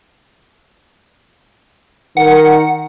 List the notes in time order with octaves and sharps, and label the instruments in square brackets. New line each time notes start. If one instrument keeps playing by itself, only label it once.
[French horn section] D#3 A#4 [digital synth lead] F#5